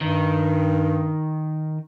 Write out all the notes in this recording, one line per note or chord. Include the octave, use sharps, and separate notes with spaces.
G2 D#3